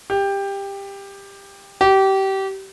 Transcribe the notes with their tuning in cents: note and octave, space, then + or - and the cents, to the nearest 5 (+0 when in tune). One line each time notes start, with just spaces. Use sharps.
G4 +15
G4 -25